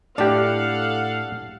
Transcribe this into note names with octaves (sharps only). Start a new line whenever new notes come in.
A2 D4 G4 A4 F5 F#5